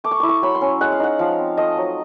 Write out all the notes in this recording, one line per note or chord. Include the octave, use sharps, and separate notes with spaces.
A3 D6
C#6
E4 D6
C#6
F#3 B5
C6
C#4
G#3 F#5
F5
D#4 F#5
F3 F5
C4
A3 D#5
F#3